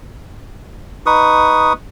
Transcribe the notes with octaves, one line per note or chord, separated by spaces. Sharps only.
D#4 B4 C#6 D#6